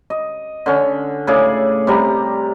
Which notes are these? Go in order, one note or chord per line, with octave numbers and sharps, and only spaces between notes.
D#5
D3 C#4
A2 C#3 G#4 D5
C3 G3 A#5